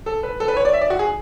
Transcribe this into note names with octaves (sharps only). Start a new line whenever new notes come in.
A4
B4
A4
B4
C#5
D5
E5
D5
F#4
G#4